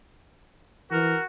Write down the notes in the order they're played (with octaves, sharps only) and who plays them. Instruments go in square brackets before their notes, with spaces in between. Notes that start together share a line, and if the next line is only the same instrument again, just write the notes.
[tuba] E3 [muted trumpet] F#4 [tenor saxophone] A#4